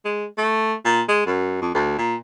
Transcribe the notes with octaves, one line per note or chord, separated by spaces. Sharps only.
G#3
A3
A#2
G#3
F#2
F2
D2
A#2